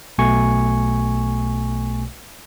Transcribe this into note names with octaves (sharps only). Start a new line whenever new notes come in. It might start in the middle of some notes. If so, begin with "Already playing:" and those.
B1 B2 A3 G#5 C#6